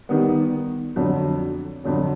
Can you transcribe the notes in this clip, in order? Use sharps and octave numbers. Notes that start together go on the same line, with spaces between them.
D#3 G3 B3
F2 D3 F#3
F2 D3 F#3